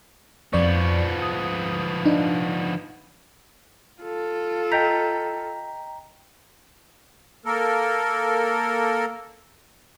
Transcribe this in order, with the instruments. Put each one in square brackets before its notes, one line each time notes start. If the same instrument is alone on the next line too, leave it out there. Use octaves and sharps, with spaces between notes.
[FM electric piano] F2 D5 C#6 [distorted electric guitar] F3 B3
[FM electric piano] D#6
D4 D#4
[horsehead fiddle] F4 A4
[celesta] D#5 G6 B6 [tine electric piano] G5 A#5
[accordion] A#3 A4 A#4